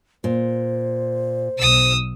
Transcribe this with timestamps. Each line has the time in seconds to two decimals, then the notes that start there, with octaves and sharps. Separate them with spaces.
0.24 A#2 C5
1.59 B1 D#6 E6